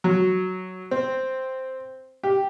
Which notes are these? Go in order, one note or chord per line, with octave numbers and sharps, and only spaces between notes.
F#3
C4
G4